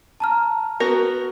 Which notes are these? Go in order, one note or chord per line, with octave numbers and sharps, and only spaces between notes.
A5 A#5 F6
B3 F#4 A#4